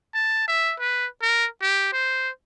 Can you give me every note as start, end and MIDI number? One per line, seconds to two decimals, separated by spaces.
0.14 0.44 81
0.48 0.74 76
0.79 1.06 71
1.22 1.46 70
1.62 1.92 67
1.93 2.29 72